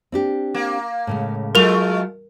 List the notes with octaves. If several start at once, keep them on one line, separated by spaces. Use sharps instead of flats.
C4 D4 G4
A#3
A2 C#3 G#3
F#3 G#3 A3 F4 A#4 F7